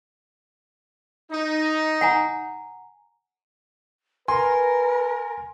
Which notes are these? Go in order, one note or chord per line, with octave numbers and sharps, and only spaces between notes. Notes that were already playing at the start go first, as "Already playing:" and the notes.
D#4
F#5 G#5 A#5
A#4 B4 G#5 C6